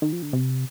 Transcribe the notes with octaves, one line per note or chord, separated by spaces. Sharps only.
D#3
F3
D3
C3